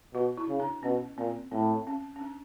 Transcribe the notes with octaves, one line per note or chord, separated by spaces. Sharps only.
B2 F#4
E4
C#3
D4
B2 C#4
A#2 C4
A2 C4
C#4
C#4
D4